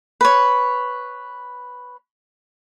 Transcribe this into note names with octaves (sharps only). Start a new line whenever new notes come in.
B4 C#5